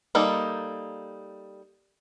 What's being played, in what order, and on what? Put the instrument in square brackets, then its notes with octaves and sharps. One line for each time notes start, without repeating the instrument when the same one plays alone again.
[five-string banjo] G3 A#3 D#4 A4